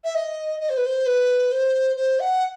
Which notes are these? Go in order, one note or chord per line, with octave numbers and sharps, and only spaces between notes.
E5
D#5
D#5
C5
B4
C5
B4
C5
C5
F#5